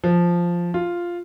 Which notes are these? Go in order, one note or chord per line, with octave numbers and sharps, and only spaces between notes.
F3
F4